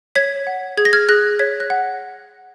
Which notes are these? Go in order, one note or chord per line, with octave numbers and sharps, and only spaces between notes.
C#5 G#6 B6
F#5
G#4 G#6
A#6
F6 G#6
G#4 F#6 A#6
C#5 G#6 B6
F#6 A#6
F#5